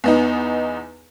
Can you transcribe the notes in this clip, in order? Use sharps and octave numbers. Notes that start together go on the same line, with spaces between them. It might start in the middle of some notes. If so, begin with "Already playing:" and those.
E2 B3 D#4